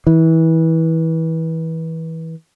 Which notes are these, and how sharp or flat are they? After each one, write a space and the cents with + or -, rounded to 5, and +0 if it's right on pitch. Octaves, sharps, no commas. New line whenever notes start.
E3 -25